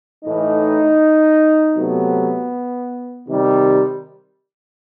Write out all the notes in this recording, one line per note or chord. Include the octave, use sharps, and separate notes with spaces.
A2 E3 A3 D#4
C3 F#3 A3 B3
C3 D#3 G3